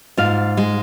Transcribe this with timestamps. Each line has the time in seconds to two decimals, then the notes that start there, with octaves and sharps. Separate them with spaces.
0.17 G#2 F4 F5
0.57 G#3